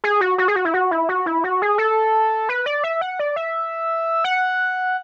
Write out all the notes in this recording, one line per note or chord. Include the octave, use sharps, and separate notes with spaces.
G#4
F#4
F#4
G#4
F#4
E4
F#4
E4
F#4
E4
F#4
G#4
A4
B4
D5
E5
F#5
D5
E5
F#5